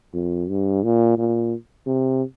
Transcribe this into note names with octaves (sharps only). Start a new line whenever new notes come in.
F2
G2
A#2
A#2
C3